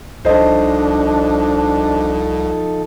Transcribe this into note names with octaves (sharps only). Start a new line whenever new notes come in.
C2 F3 D4 D#4 A4 C5 D#5